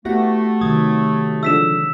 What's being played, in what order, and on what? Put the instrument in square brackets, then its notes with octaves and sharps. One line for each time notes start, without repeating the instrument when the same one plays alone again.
[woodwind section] A3 [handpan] B3 F#4 G4 [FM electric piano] E4 F#5 A#6
[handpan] C3 D#3 F#3 [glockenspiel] D#6 [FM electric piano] G#6
[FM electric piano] D3 F3 G#3 [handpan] E5 [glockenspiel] E6 B6 E7